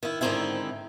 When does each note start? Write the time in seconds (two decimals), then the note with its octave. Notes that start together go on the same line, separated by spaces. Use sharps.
0.03 D#3 E4
0.21 G#2 D3 D#3 C4 D#4 E4